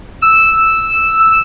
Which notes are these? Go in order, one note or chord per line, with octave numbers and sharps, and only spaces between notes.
E6